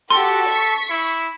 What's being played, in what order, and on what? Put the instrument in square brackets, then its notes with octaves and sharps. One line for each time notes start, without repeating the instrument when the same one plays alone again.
[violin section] F#4 G4 [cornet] A4 [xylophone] C6
[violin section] C#6 B6
[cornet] E4